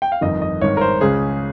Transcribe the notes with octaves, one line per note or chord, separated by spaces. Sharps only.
G5
F5
G1 F2 D#3 D#5
D#5
G#1 G2 D#3 C#5
A#4
C5
C#2 C#3 G#4